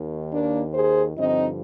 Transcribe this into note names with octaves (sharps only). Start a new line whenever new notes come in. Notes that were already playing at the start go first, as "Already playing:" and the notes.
Already playing: D#2 D#3
A#3 D4
G#4 C5
G2 D3 F3 C4 D#4